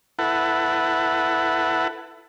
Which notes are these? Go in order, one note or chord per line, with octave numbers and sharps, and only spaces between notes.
E4 A4 B4 F#5